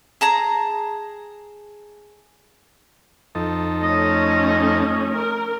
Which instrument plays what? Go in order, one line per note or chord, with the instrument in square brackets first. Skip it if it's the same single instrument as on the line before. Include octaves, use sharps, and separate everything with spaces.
[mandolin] G#4 A5 A#5
[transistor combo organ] F2 D#4 A4
[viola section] A3 C#4 [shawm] D#5
[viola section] A#4